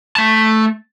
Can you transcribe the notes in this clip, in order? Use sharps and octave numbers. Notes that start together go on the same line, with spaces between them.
A3 A5